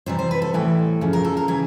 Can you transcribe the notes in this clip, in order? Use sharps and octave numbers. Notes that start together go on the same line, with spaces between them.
C3 E3 G3 C5
C5
B4
A4
A2 E3 G3 A4
C#3 F3
A#4
A4
A#4
C#3 E3 G3 G#4